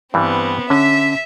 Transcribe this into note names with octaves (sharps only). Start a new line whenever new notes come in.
G2 E3 G3 B3 C4
D3 C#4 E5 B6